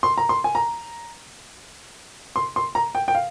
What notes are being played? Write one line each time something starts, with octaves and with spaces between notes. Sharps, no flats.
C6
A#5
C6
G#5
A#5
C6
C6
A#5
G5
G5
F5